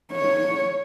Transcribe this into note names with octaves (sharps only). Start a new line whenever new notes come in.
C#5